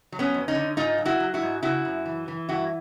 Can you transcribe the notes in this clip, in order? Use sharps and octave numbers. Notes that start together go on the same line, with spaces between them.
F#3
B3 C#4
F2
C#4 D#4
D3
G#2 D#4 F4
F#3
E4 F#4
F#3
E4 F#4
G#2
C#3 E4 F#4
F#2
E3
E3
G2 E4 F#4